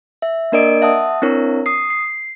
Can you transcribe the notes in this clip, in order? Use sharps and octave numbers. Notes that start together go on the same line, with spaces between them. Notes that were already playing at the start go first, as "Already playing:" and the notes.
E5
A#3 D4 A#4 D5 D#5 D7
E5 F#5 A5 D#6
C4 D4 E4 A#4 C#5
D#6 C7
C7